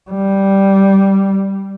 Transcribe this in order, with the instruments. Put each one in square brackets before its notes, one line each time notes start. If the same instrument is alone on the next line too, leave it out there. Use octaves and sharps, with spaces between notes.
[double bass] G3